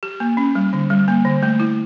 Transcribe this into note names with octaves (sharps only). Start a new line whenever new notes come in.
G4
A#3
C#4
G3
D3
G3
A#3
D3
A3
E4